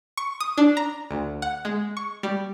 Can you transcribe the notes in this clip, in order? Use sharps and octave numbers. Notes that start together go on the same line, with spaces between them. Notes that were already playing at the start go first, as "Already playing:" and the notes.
C#6
D#6
D4
A#5
D2
F#5
G#3
C#6
G3